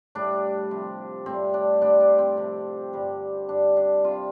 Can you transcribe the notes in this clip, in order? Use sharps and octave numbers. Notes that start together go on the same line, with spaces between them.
A2 G3 D4
C3 F3
A2 G3 C4
D4
A2 G3 D4
D4
C4
C3 F3
G2 D3 G3
G2 G3 D4
D4
C3 G3 F4